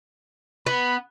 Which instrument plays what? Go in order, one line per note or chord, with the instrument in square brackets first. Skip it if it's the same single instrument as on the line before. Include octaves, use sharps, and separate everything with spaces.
[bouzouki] B3 [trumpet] B5